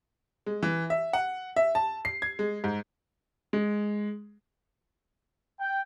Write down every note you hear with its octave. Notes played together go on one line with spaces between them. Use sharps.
G#3
E3
E5
F#5
E5
A5
C7
G#6
G#3
G#2
G#3
G5